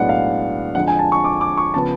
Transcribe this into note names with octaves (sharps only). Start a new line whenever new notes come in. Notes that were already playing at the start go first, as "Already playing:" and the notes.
Already playing: B1 A2 G#3 B3 D4 F#5
F5
F2 D3 G#3 F#5
G#5
A5
C#6
D6
D6
C#6
C#3 F3 B3 A5